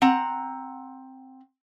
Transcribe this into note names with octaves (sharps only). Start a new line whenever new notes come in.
C4 F#5 A#5